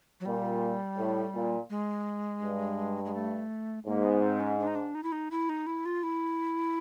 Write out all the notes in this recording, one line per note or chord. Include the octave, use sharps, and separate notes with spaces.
F#3
A#2 G3
A2
A#2
G#3
G2
G#3
A3
G#2 A#3
B3
C4
C#4
D4
D#4
D4
D#4
E4
D#4
E4
D#4
E4
F4
E4